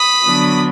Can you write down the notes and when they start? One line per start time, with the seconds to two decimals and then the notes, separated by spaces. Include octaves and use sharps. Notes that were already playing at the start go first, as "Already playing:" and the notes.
Already playing: B5 D#6
0.26 D3 F#3 B3 D4